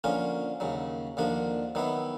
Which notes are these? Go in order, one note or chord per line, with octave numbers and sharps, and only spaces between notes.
D3 F3 A#3 C#4 F4
D#2 C#3 F#3
D#2 D3 F3 A#3 D4
D#3 F#3 B3 E4